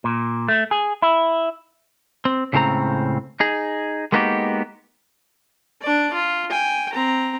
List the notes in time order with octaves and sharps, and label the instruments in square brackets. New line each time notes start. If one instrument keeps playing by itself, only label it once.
[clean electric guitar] A#2
A3
G#4
E4
C4
C#2 A2 C#3 A3 C4 A#5
D#4 G#4
G#3 A#3 B3 D#4 F#4 G4
[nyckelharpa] D4 D5
F4
G5 G#5
C4 A#5